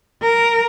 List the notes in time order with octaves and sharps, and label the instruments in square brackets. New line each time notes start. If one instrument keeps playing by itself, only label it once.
[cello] A#4